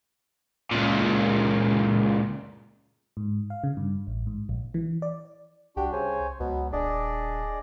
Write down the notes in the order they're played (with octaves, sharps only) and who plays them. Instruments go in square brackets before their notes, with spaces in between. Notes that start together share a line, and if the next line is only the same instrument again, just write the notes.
[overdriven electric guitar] C#2 A#2
[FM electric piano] G#2
F5
C#3
G2
A1
G#2
A#1
E3
D5
[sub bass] C2 [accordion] D4 F#4 [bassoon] G4
[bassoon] C#3 [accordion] C5 C#5 G#5
[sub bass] C#2 [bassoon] B2 [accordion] F#3 B3
[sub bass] D#1 [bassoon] D4 [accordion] G#4 D5 D#5